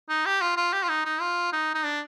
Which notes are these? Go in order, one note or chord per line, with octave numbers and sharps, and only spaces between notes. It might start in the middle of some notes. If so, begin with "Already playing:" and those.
D#4
G4
F4
F4
G4
F4
D#4
D#4
F4
D#4
D#4
D4